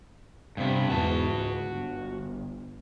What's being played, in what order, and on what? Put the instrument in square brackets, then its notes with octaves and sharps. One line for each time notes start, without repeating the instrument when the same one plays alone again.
[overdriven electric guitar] G2 B3 [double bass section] C3
[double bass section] E2 G#2 E3 [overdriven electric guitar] F#4 A5
[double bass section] C#2
G1